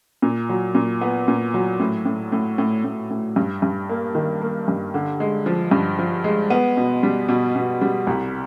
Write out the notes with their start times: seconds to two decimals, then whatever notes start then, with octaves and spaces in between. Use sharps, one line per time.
0.22 A#2
0.49 F#3
0.75 A#2
1.01 B3
1.28 A#2
1.54 F#3
1.80 A2
2.05 A2
2.32 A2
2.58 A2
2.84 A2
3.10 A2
3.36 G2
3.62 G2
3.90 A#3
4.15 D#3
4.42 A#3
4.68 G2
4.94 D3
5.20 G#3
5.46 F3
5.71 G2
5.99 F3
6.24 G#3
6.50 B3
6.77 B2
7.03 G3
7.29 B2
7.56 B2
7.81 G3
8.07 C2